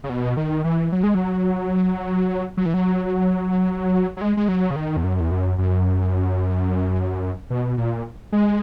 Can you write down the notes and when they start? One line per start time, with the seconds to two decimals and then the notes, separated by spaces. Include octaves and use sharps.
0.04 C#3
0.09 B2
0.37 D#3
0.64 E3
0.92 F#3
1.03 G#3
1.15 F#3
2.57 F#3
2.66 E3
2.74 F#3
4.17 F#3
4.21 G#3
4.37 G#3
4.48 F#3
4.71 C#3
4.76 D#3
4.97 E2
5.04 F#2
5.20 E2
5.31 F#2
5.58 F#2
7.50 B2
7.78 A#2
8.32 G#3